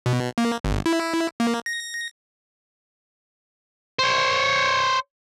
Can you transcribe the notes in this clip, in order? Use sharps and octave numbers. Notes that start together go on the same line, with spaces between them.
B2
A#3
G1
E4
A#3
A#6
C5 C#5